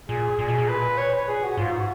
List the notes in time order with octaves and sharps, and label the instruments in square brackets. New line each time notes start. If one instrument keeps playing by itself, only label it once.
[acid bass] A#2 [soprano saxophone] G#4
[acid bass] A#2 [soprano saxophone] G#4
[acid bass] B2
A#2
[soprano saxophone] B4
C#5
B4
G#4
F#4
[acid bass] G#2 [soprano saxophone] F4
[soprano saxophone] F#4